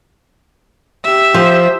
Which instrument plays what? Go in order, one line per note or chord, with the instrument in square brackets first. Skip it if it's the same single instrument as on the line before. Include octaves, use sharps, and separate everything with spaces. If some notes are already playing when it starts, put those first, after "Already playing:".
[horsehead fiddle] G4 [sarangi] E5
[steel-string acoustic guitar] F3 [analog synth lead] C5